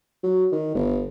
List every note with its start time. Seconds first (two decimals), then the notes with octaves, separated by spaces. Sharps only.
0.23 F#3
0.52 D#3
0.75 G1